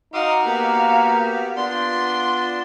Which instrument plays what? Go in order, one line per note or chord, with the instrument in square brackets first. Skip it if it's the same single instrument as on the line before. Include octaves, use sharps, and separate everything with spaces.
[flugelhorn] D#4 [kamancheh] F#4 F5 [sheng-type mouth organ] C6 D6 D#6
[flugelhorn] A#3 [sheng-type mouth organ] B3 G4
[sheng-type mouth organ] B3 D4 D5 [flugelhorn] F4 [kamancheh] C6